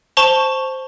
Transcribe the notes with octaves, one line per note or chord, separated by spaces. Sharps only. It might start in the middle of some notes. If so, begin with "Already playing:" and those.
C5 A5 C#6 E7 F7 G7